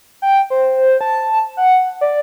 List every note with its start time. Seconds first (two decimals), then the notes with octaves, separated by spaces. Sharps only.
0.22 G5
0.50 C5
1.01 A5
1.57 F#5
2.01 D5